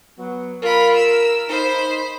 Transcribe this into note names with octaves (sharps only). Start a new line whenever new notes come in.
F#3 B3
F4 A#4 B5
E6
D#4 C5 B5